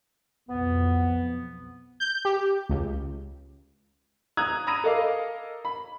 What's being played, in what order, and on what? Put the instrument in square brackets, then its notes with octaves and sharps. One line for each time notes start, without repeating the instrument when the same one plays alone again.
[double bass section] B1 F2 [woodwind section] B3
[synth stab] G6
G4
C#2
[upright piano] A#5 D#6 F#6 G#6
A#5 B5 D#6 A#6 D#7
A4 A#4 D#5 F5 D6
B5